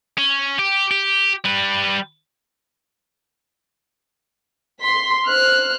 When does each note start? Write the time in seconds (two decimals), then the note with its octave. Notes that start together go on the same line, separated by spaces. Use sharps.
0.18 C#4
0.59 G4
0.91 G4
1.45 G3 B4
4.81 C6 B6
5.27 C5 F6 F#6